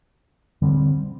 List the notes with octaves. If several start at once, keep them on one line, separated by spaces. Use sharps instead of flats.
D3 G3 C4